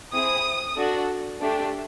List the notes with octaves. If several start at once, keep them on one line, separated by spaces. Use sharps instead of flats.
C4 E4 G#4 D#6
D4 F#4 A4
A3 D4 G4